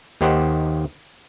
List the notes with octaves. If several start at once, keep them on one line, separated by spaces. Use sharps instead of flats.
D#2 D#3 G4 C5 F#5